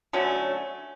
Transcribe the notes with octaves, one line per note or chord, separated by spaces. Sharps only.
D3 F#3 A3 C#4